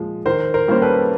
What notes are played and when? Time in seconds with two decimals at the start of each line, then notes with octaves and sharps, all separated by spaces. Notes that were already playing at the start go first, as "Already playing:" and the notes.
Already playing: A#2 F3 G#3
0.25 D#3 A#4 C5
0.54 A#4 C5
0.68 G3 A#3 C#4 C5
0.82 A4 B4